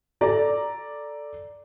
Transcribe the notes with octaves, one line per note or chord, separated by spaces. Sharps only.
A4 D5 A#5